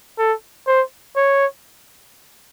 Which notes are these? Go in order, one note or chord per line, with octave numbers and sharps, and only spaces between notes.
A4
C5
C#5